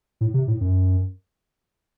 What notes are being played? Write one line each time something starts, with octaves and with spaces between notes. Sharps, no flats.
A2
C3
A2
F#2